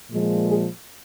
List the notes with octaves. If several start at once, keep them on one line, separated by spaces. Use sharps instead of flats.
A#2 F3 G#3
G#4